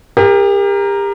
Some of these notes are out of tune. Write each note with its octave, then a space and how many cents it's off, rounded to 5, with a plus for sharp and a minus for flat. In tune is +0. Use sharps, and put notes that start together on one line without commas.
G4 +35 A#4 +0